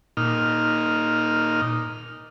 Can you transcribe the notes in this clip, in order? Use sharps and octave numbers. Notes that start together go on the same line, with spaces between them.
A#2 D#4 F6